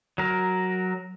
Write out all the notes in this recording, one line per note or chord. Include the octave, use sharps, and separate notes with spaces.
F#3 A#4